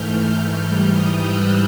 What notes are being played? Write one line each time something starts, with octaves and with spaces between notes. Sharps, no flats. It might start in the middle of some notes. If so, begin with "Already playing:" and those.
Already playing: G#2 E3 A3 F6 G6
G#2 E3 G3 F6 G6
D#6 F6
E6 F#6